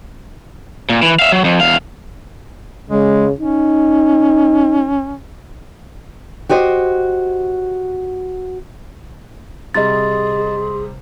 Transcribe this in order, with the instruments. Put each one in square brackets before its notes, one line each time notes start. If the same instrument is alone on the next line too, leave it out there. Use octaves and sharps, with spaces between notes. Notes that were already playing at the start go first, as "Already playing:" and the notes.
[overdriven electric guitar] A#2
E3
E5 F5
F#3
F2
E2 F5
[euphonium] C#3 [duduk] G#3
[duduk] C#4 [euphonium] D#4
[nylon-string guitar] F#4 G4 C5 D#5
[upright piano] C3 G3 [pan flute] G#4 [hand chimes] D#5 A6 [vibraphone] C6